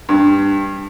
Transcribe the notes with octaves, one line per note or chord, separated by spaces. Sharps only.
G2